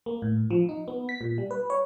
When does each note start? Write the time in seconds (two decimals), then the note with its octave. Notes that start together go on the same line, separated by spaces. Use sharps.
0.06 A#3
0.22 A2
0.51 F3
0.69 D#4
0.88 B3
1.09 B6
1.21 A#2
1.38 G3
1.51 B4
1.70 C#5